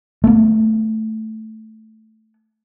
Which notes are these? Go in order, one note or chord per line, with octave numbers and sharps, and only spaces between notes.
A3 B3